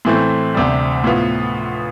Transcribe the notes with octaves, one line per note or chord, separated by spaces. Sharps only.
A2 E3 A3 C4
D2 C3 G3
A2 F3 B3 F4